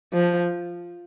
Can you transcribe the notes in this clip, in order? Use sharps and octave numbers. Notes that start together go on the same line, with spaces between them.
F3